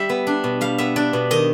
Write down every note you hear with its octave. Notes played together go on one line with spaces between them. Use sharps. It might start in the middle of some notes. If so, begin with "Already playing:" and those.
Already playing: G3 E5
B3
D4
B2
G3 F5
B3 E5
D4 D5
B2
D#3 D#5